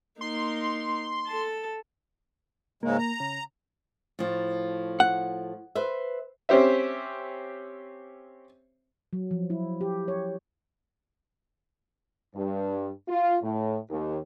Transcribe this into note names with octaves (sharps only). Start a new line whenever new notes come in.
A#3 D#4 C6
A4 A5
G#2 C#3 G#3 A#3
A#5
C#3
A2 F3
F#5
B4 C5 E5
C4 C#4 G4 C5 E5
F#3
F3
E4
G4
C#5
G2
F4
A2
D#2